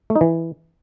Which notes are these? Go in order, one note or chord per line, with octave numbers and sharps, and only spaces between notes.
A3
D#4
E3